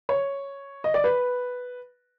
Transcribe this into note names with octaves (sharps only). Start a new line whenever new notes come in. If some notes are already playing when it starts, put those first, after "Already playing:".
C#5
D#5
D5
B4